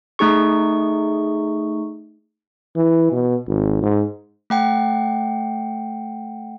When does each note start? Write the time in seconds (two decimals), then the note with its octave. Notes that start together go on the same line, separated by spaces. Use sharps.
0.19 A3 D#4 G#4 C#6
2.76 E3
3.12 B2
3.48 G#1
3.82 G#2
4.50 A3 F#5 G5